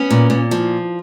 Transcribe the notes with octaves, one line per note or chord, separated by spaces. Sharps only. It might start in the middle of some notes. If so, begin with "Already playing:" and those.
Already playing: B3 C#4
A#2
A#2
F3